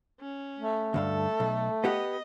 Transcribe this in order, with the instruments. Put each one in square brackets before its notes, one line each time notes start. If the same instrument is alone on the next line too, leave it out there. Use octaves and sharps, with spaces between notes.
[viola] C#4
[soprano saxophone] A3
[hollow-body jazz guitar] D2 G2 F5 [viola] A4
[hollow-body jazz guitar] B1
[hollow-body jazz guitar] B3 G4 F#5 [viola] D#5